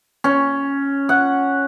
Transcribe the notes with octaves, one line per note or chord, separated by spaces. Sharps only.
C#4
F#5